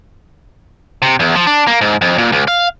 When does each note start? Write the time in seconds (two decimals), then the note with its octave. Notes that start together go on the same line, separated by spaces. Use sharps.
1.02 C3
1.20 E2
1.36 F3
1.47 D4
1.67 A#3
1.81 G#2
2.01 F2
2.18 A#2
2.32 C#2
2.48 F5